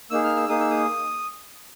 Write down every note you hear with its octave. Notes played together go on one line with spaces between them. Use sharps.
A#3 D#4 G#4 E6
F6
E6
A#3 D#4 G#4 D#6
E6
D#6